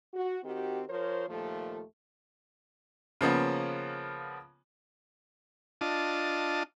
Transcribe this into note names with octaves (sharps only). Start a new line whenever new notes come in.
F#4
D#3 C4 F#4 G4
F3 A#4 C5 C#5
D#2 A#2 F3 A3
C#3 F3 A#3 B3 C#4
D4 F4 D#5 A5